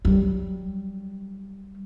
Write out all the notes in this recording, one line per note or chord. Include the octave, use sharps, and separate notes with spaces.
F#3 G3